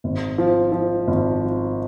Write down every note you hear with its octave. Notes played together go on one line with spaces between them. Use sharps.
G#1
F3
F3
G#1
F3